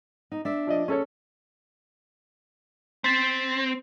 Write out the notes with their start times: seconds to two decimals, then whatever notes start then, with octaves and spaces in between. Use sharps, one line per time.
0.32 D#4
0.45 D4 E5
0.67 F3 D5 D#5
0.88 C#4 G#4 A4 C#5
3.04 C4 A6 B6